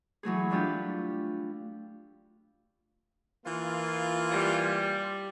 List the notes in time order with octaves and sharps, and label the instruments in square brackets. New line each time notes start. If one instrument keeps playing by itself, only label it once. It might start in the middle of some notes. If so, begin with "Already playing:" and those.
[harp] E3 F#3 A3 G#4
G3 A3 D4 F4 G4
[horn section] E3 A#3 F4
[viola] G3